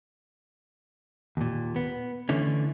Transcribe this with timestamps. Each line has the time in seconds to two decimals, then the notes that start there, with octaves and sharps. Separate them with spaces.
1.37 D#2 A#2
1.76 B3
2.29 D3 E3 A3 C#4